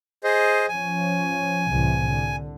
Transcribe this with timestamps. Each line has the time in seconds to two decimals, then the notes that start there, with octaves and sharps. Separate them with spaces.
0.24 G#4 C5 D#5
0.68 F3 C#4 G#5
1.68 C2 A2 E3
2.07 D3